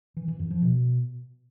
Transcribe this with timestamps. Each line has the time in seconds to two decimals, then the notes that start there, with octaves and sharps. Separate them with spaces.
0.17 E3
0.28 E3
0.39 F#2
0.51 F3
0.62 B2